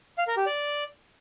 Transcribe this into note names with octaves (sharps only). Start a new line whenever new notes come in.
F5
A#4
G4
D5